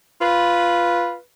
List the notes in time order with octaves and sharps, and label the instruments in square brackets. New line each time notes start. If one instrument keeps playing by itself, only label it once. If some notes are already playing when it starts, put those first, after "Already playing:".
[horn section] F4 B4 B5